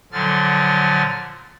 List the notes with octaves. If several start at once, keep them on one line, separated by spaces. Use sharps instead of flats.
A#2 D3 F3 F#3 F6 A6